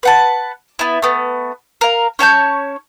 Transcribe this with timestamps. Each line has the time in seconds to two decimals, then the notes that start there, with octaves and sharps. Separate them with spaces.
0.03 B4 F#5 A5
0.79 B3 E4
1.02 A3 B3
1.81 A#4 F5
2.19 C#4 C#5 A5 G6